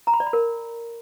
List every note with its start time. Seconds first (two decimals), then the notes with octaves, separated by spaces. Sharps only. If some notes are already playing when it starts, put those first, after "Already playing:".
0.07 A#5
0.14 B5
0.20 D5
0.27 B5
0.33 A#4